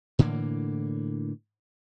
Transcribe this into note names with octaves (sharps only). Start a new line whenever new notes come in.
A2 D3 E3 A#3